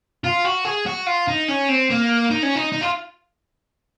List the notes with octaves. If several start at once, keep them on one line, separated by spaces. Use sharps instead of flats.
F4
F#4
G#4
F#4
F4
D#4
C#4
C4
A#3
D#4
C#4
D#4
D#4
F4